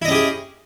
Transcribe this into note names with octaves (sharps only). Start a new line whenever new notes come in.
C#4 E4 G4 G#4 D#5